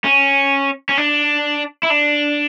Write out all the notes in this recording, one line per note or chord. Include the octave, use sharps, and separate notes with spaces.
C#4
C#4
D4
E4
D4